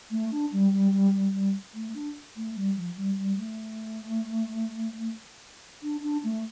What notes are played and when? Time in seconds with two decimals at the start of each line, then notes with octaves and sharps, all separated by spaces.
0.11 A3
0.31 D4
0.52 G3
0.73 G3
0.92 G3
1.13 G3
1.33 G3
1.74 A3
1.94 D4
2.36 A3
2.56 G3
2.76 F3
2.97 G3
3.18 G3
3.37 A3
5.82 D4
6.03 D4
6.24 A3